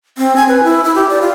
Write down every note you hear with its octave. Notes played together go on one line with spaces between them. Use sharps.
C4
G#5
B4
E4
E4
G4
D5
F4